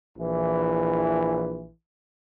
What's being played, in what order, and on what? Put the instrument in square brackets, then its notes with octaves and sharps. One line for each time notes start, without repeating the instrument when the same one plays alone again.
[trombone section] A#1 E3